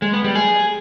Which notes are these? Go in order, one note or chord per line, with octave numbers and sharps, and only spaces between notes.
G#3
B3
G3
G#4